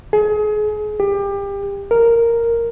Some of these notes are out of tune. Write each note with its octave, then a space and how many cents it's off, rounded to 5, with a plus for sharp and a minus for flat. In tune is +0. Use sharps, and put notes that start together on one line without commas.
G#4 +30
G4 +30
A#4 -5